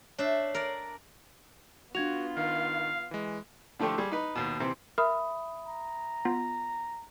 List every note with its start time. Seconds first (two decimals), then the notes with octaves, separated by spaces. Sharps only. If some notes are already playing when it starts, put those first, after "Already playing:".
0.19 D4 C#5 E5 C7
0.54 A#4 D5
1.95 B3 D4 F4 F#4 G#6 F7
2.37 D#3 F5
3.11 E3 G#3
3.79 D3 F3 A3 D4 G4
3.98 G3 G#4
4.12 D#4 B4
4.35 D#2 B2
4.60 C3 E3 C4
4.98 A#4 E5 B5 D#6
5.67 A#5
6.25 B3 F4